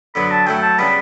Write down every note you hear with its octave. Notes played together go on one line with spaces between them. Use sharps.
D3 F#3 B3 B5
A5
F#3 A3 E4 G5
A5
C#3 G3 B3 B5